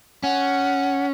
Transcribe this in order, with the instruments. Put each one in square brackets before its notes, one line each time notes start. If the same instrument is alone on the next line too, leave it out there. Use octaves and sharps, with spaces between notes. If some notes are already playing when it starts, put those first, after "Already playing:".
[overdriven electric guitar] C#4 [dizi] F#5